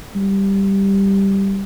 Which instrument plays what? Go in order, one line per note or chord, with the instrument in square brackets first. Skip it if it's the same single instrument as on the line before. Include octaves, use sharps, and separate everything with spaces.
[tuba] G3